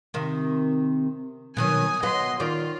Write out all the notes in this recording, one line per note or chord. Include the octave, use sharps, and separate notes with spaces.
C3 D#3
B2 D#3 F#3 G#5 D#6
F#3 B3 F#4 D#5 C6
D#3 F4 D5